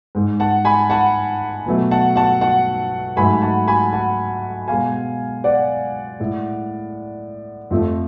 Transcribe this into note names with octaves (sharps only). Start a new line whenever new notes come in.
G#2 G#3
F#5 A5
G#5 B5
F#5 A5
B2 F#3 A3
F#5 A5
F#5 A5
F#5 A5
G#2 F#3 A3 G#5 B5
F#5 A5
G#5 B5
F#5 A5
B2 G#3 F5 G#5
D5 F#5
A2 G#3
F2 F3 A3